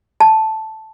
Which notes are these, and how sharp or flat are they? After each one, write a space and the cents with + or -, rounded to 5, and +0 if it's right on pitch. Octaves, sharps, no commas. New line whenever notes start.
A5 +0